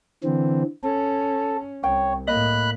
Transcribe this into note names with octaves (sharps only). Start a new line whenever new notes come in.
D3 E3 C4
C#4 A4
C2 C#5 G5
A2 A#3 D#5 B5 F#6